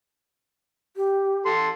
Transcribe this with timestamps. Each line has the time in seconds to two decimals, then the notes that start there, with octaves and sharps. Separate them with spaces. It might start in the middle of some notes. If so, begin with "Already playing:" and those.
0.97 G4
1.45 A4 C6